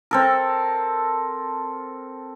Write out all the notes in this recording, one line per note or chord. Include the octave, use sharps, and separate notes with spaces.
C4 A4 A#4